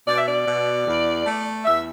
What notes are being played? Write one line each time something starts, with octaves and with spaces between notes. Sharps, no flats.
B2 D5
E5
D5
B2
E2
A3
E2 E5